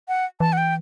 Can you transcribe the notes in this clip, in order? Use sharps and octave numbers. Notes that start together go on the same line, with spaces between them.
F#5
E3 A5
F#5
G5